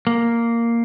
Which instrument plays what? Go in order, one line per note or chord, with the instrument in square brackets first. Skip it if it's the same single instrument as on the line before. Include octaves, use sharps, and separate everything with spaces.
[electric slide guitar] A#3